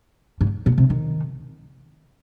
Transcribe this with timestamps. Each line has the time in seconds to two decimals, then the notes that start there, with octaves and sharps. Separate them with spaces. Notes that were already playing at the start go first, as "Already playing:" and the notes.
0.41 G#2
0.66 A#2
0.78 C3
0.90 D#3